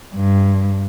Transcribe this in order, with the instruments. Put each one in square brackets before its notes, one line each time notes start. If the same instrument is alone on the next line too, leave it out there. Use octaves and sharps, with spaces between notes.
[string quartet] G2